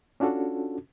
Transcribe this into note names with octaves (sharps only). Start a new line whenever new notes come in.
C#4 D4 F4 F#4 A4